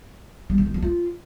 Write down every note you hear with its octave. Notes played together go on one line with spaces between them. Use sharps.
G3
C#3
D#3
F3
F4